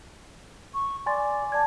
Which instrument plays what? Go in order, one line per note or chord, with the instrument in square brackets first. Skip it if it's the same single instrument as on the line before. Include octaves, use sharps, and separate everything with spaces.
[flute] C#6
[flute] D5 [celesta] G#5 C6 A6
[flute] D5 [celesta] A5 G#6